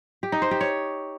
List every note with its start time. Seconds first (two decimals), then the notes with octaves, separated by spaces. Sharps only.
0.23 G4
0.32 D#4
0.42 C5
0.51 G4
0.61 C#5